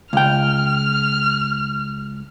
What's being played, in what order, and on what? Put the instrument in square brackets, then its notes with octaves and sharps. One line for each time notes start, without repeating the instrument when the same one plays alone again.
[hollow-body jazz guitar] C#2 G5 [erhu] F6